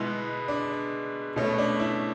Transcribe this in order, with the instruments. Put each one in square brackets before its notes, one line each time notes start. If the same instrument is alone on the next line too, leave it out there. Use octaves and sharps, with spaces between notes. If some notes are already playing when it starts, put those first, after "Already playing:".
Already playing: [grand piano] B2 G#3 B3 E4
D4
B2 A3 C#4
D4
E4